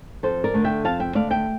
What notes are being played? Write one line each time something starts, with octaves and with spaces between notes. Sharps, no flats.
F2 A4 C5
A#4 D5
D3 A3
E5 G5
F2 F5 A5
E5 G5
D3 A3 D5 F5
E5 G5